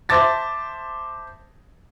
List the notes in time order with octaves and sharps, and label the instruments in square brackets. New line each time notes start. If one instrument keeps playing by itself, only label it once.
[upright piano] C5 E5 A5 D6 A6 A#6